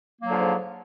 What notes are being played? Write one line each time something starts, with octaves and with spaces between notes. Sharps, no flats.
G#2 D3 F3 F#3 A#3